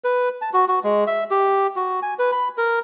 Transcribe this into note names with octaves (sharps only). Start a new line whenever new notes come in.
B4
A5
F#4
F#4
G#3
E5
G4
F#4
G#5
B4
B5
A#4